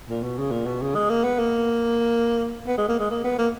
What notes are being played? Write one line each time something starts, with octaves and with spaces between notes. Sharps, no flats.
A#2
B2
C#3
A#2
B2
C#3
G#3
A#3
B3
A#3
B3
G#3
A#3
G#3
A#3
B3
A#3